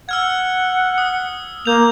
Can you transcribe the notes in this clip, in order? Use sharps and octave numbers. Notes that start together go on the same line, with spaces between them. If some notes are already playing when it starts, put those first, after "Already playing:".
F#5 E6 F6 G#6
D#6
A#3 G6 F7